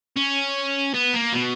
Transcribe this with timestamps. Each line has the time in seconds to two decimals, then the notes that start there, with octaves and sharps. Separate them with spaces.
0.16 C#4
0.94 B3
1.14 A#3
1.33 B2